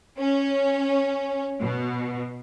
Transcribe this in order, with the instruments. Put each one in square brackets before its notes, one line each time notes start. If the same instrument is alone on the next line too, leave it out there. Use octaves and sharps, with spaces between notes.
[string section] C#4
B2